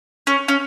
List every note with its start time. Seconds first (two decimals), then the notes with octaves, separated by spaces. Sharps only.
0.27 C#4
0.48 C#4